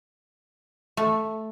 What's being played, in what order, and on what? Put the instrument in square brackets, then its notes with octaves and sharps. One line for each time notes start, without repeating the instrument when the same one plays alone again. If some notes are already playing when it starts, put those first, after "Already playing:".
[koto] A3